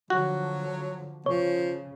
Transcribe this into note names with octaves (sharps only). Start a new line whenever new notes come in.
D3 F3 F#3 F#4
C#3 F3 C#5